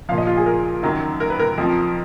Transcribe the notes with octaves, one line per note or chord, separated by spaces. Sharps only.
A#2 F3 F5
D#5
F4
G#4
A#4
F#2 D#3 F#3
A#4
B4
A#4
F2 F3